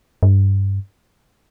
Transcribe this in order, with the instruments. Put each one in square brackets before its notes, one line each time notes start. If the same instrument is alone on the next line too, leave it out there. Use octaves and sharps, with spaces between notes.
[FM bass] G2